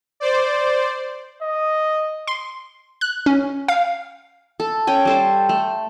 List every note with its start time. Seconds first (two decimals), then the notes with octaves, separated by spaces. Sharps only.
0.20 C5 D5
1.42 D#5
2.27 C6
3.01 F#6
3.26 C#4
3.68 F5
4.60 A4
4.87 C#4 G5 G#5
5.05 G3 A4 C5
5.49 A3